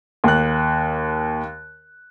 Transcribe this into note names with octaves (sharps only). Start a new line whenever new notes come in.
D#2 F#6